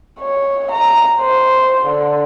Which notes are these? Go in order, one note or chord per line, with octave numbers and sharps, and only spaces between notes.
C#5
A#5
C5
D3